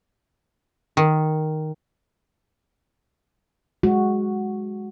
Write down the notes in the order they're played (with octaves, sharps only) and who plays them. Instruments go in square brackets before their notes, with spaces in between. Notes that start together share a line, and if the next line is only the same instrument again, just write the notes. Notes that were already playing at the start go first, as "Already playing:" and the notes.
[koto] D#3
[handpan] G#3 F#4